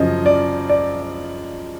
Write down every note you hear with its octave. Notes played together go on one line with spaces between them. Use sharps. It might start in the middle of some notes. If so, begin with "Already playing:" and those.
Already playing: F#2 C#3 F3 D#5
D5
D5